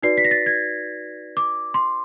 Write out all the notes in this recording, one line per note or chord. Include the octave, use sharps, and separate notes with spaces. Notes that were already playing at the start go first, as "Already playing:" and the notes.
D#4 F#4 B4 D5 C7
B6
A#6
A6
G#6
D6
C6